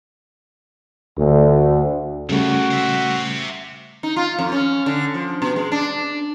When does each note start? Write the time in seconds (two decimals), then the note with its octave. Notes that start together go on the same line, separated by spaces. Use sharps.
1.18 D2
2.29 C#2 G2 C#3 G3 A3 F#4
2.71 C5 E5
4.03 D#4
4.16 F4
4.39 F2
4.52 C#4
4.86 D3
5.14 F3
5.42 B2
5.56 G#3
5.72 D4